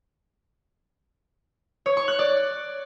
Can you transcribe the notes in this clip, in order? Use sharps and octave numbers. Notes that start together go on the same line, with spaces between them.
C#5
C#6
F#6
D5